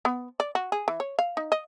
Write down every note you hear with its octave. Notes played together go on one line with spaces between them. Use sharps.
B3
D5
F#4
G#4
E3
C#5
F5
D#4
D#5